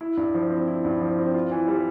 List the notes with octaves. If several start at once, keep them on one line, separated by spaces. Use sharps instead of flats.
E4
G2
F3
C4
E4
G2
F3
C4
F4
E3
G3